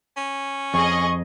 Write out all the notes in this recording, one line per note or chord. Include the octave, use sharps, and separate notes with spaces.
C#4
F2 G#4 D#5 C#6